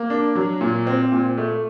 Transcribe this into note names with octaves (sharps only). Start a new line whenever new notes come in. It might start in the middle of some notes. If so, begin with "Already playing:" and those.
Already playing: A#3
D4
F#3
A#2
C4
A#2
A3